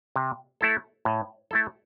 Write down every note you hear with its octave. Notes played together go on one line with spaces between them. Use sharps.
C3
A3 E4 A4
A2
A3 E4 A4